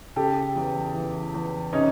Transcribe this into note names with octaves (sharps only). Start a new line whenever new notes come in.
C#3 G4 A4
E2
E3
E2
C3 C#4 D#4